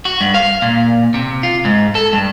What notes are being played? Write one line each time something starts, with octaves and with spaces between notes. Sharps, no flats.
F#4
G2
F5
A#2
C3
F4
G#2
A4
G2